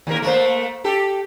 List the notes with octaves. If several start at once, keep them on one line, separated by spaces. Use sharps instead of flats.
D#2 A#3 A#4
A3 A#3 C5
G4 A4